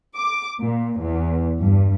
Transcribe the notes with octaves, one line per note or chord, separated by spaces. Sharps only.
D6
A#2
E2
G2